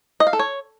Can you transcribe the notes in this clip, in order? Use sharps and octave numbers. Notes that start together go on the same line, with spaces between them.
D#5
F5
A4
C#5